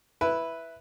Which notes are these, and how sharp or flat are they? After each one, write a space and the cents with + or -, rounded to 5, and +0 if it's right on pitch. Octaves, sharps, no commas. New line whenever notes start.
E4 +0 B4 +0